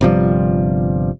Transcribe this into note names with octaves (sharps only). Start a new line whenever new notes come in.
G1 C3 F3 G3